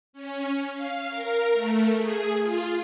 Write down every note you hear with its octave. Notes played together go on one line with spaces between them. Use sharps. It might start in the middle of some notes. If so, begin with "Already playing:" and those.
C#4
F5
A#4
A3
G#4
F4